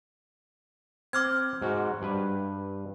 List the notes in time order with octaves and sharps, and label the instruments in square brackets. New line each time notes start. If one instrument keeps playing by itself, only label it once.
[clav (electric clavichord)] C4 [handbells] D6 F6 G#6
[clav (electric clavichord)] G#2 F#4
G2 B4